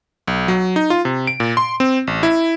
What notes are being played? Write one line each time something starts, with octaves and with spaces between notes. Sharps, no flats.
B1
F#3
D#4
F4
C3
D7
A#2
C6
C4
A1
E4